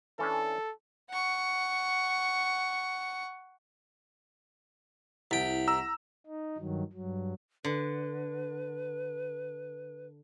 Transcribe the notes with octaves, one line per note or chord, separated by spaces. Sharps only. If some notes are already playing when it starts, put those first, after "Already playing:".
E3 C#4 D4 A4
F#5 C#6
C2 E4 F#5 G5 B6
A#5 E6
D#4
G2 D#3 F#3
G2 F#3
D3 B4